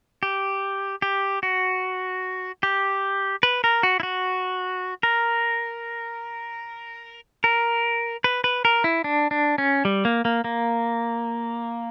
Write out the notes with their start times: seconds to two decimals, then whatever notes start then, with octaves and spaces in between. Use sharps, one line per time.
0.23 G4
1.02 G4
1.43 F#4
2.63 G4
3.43 B4
3.64 A#4
3.83 F#4
4.00 E4
4.03 F#4
5.03 A#4
7.44 A#4
8.24 B4
8.44 B4
8.65 A#4
8.84 E4
9.04 D4
9.31 D4
9.58 C#4
9.85 G3
10.05 A#3
10.25 A#3
10.44 A#3